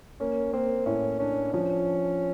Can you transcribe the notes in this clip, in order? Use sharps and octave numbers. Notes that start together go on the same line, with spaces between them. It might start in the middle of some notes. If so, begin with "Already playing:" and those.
A#3 C#4
A#3 C4
A2 C#4
C#4 D4
F3 C#4